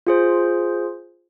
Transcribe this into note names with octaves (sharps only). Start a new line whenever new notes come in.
F4 G#4 C5